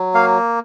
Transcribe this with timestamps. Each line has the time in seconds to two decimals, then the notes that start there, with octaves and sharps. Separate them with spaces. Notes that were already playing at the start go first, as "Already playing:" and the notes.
Already playing: F#3
0.14 A#3 F5